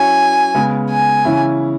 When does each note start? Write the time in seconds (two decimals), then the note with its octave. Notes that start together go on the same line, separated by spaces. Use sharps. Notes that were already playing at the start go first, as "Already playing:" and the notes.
Already playing: F#3 C#4 E4 C#5 G#5
0.55 C#3 G#3 B3
0.90 G#5
1.25 C#3 E3 C#4 E4